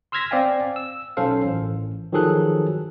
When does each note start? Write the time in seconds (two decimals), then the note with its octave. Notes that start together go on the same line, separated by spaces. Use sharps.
0.12 C6 E6 F6 G#6 A#6 B6
0.31 C4 D5 F5 G5 G#5
0.76 E6
1.17 B1 C#4 A4 C5 F5
1.46 A1
2.13 D#3 F3 F#3 G#4 A4 F#6